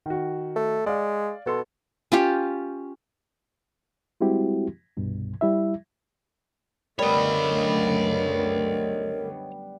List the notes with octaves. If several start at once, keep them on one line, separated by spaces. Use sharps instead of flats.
D#3 F#4
A3
G#3 D5 F5
B2 F#4 A4 C6
C#4 F4 G4
G3 G#3 C4 E4 F#4 G4
C2 G2 B2
G3 E4 E5
F#2 D3 G3 A3 B3 A#4 C#5 D#5